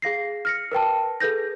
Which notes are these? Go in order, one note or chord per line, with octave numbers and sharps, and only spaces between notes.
G#4 F5 A#6 C7
F6 A#6 C#7
A#4 B4 G5 A5
G#4 A4 B4 G6 A#6